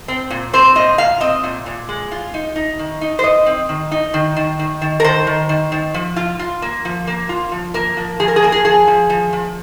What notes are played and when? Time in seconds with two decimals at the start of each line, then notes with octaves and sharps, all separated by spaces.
0.08 C4
0.30 A#2
0.53 C4 C5
0.75 A#2 D#5
0.98 A#2 F5
1.21 C4 D#5
1.44 A#2
1.66 A#2
1.89 G#3
2.12 F4
2.34 D#4
2.56 D#4
2.79 D#3
3.01 D#4
3.19 C5
3.24 D#4 D#5
3.46 C4
3.69 D#3
3.91 D#4
4.14 D#3
4.36 D#3
4.59 D#3
4.82 D#3
5.00 A#4
5.04 D#3 C5
5.27 D#3
5.49 D#3
5.72 D#3
5.94 F3
6.16 F4
6.39 F4
6.62 A#3
6.85 F3
7.07 A#3
7.29 F4
7.52 F3
7.74 A#3 A#4
7.97 F3
8.20 F3 G#4
8.28 A#4
8.36 G#4
8.42 A#3 A#4
8.52 G#4
8.65 F3 G#4
8.87 F3
9.10 F3
9.33 F3